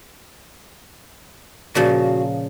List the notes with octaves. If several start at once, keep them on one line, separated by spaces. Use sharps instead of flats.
A#2 C#3 F3 F#4